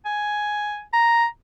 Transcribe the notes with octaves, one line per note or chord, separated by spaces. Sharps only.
G#5
A#5